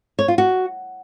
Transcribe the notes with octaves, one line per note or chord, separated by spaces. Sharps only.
C#5
F4
F#4